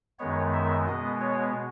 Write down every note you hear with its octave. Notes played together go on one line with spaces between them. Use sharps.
F#2 D#3 G#3 B3 C#5
E5
B2 G#3 B3 D#5
C#5